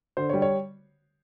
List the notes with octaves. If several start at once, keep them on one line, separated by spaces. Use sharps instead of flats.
D3 C5
C#5
G3
C#5